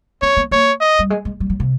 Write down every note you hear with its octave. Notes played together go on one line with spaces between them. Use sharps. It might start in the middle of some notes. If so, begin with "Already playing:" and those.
C4 C#5
B3
A#3 C#5
D#5
G3
G#3
G#3
G3
F#3
C3